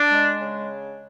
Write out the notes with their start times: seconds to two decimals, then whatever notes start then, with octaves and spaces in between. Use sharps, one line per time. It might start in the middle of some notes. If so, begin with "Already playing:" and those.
Already playing: D4
0.11 G#3
0.40 C#3